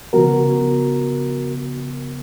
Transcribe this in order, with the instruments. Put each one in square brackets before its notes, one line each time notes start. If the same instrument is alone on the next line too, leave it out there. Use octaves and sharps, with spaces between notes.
[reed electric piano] C#3 F3 B3 F#4 A#4